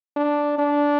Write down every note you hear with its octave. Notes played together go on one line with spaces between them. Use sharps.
D4
D4